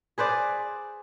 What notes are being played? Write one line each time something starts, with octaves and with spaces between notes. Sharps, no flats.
G#4 B4 C5 D5